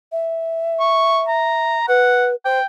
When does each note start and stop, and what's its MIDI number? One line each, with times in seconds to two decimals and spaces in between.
0.12 1.78 76
0.80 1.21 85
1.28 1.87 82
1.88 2.35 71
1.88 2.27 78
2.45 2.59 72
2.45 2.66 79